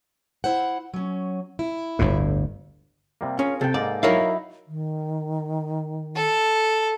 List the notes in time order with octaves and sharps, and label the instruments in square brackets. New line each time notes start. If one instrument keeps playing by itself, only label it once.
[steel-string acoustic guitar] E4 C5 F#5
F#3 C#4
E4
[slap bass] G1 D2 A2
[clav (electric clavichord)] C3 G3 A#3
[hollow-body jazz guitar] C#4 [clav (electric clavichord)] F4 G#4 A#4
[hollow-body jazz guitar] C3 [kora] A4 G5
[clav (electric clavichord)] G#2 A#3 D#5 [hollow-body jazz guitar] D5
[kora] F#3 D#4 E4 [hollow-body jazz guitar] A#4 C#5 F5
[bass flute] D#3
[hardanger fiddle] A4